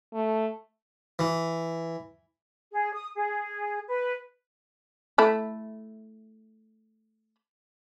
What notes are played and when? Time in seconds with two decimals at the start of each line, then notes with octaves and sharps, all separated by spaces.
0.14 A3
1.19 E3
2.74 G#4
2.93 D#6
3.16 G#4
3.88 B4
5.18 A3 E4